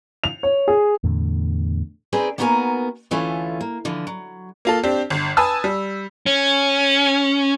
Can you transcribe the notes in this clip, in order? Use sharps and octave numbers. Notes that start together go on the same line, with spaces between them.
F7
C#5
G#4
E2 A2 D3
C4 D#4 G#4 B4 C5 D5
A#3 B3 D#4 F#4 A#4 G#5
D2 E3 A3 C#4 F4
A#3
D3 E3 F3
F#3
A#3 F4 A4
C4 D4 G4
G1
B4 G#5 A5 D#6 E6
G3
C#4